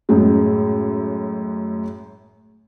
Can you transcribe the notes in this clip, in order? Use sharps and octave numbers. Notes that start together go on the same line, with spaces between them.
F#2 A2 G#3